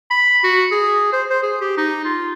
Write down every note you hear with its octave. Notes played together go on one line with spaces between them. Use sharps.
B5
F#4
G#4
C5
C5
G#4
G4
D#4
F4